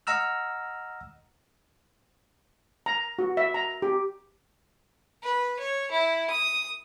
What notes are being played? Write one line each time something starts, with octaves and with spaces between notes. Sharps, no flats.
D#5 F#5 A#5 E6 F6
A#5
F#4
E5
A#5
G4
B4
C#5
E4
D#6